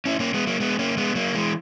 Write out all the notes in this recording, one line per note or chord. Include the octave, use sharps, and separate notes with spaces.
C#4 E4
A#3 C#4
G#3 B3
F#3 A#3
G#3 B3
A#3 C#4
G#3 B3
F#3 A#3
E3 G#3